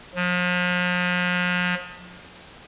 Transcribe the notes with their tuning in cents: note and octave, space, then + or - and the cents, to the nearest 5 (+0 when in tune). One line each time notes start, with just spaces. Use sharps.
F3 +40